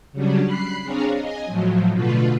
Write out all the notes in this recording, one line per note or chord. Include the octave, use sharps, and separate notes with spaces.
C#3 F#3 G3 C#4 D4
B5 F#6 C7
C4 D4 G#4 C#5 F5 A#5
D#5 G#5
A2 F3 F#3
B2 D3 A3 F4 B4